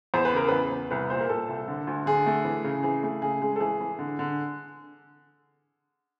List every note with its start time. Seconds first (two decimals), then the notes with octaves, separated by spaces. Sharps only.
0.14 E2 C5
0.25 B4
0.33 C#3 A#4
0.48 E2 B4
0.72 E2
0.91 C2 B4
1.10 A#2 C5
1.20 A#4
1.29 A#2 A4
1.49 C2
1.68 D3
1.87 D2
2.06 D3 G#4
2.26 A3
2.45 E3
2.64 C#3
2.83 E3 G#4
3.03 A3 G#4
3.22 C#3 G#4
3.42 G#3 G#4
3.56 A4
3.60 E3 G#4
3.80 E3
3.99 D3
4.19 D3